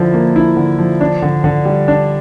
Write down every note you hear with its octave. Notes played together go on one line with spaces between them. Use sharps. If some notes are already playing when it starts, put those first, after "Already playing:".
Already playing: D3 F3 E4
A#3
E4
D3
F3
D4
D3
D3
G3
D4